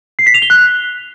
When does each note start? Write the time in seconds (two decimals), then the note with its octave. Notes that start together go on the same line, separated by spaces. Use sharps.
0.19 C7
0.26 B6
0.34 F7
0.42 G7
0.50 F#6